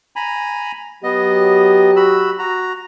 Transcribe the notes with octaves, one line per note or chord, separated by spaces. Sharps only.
G#5 A#5 B5
F#3 B3 G4 D#5
F#4 B5 E6
F#4 A#5